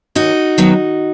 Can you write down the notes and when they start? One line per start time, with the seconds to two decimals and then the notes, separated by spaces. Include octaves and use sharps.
0.15 D#2 D#4 F#4
0.58 D#3 F#3 B3